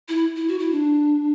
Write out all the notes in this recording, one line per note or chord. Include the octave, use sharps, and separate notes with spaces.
E4
E4
F#4
E4
D4